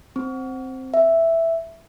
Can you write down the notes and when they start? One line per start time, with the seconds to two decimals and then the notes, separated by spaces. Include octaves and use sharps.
0.16 C4
0.94 E5